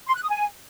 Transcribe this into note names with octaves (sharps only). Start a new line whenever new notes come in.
C6
F#6
D#6
G#5